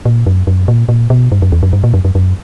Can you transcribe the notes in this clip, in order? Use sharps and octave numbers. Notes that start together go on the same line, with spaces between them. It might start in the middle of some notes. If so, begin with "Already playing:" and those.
A#2
F#2
F#2
A#2
A#2
B2
G2
F#2
E2
F#2
G2
A#2
F#2
F#2
F#2